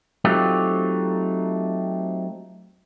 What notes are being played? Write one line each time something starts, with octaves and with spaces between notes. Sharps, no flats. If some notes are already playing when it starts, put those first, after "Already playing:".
F#3 A3 C4 D#4 F4 G4